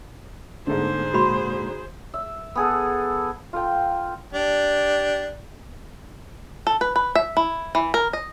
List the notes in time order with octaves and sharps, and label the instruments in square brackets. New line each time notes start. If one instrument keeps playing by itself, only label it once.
[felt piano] G#2 D3 [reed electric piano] A3 B3 A4 [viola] G#4 C5
[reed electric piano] A#2 G#3 A#3 [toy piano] F#4 B5 C6
[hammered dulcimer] E5
B3 G#4 A4
[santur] F4 A4 G5
[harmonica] D4 G4
[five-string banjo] A4
B4
B4
E5
E4
E3
A#4
D#5